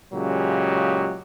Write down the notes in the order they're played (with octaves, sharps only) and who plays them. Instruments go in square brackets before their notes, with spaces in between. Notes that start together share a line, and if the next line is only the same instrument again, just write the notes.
[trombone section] A#2 C#3 F#3 G#3 G4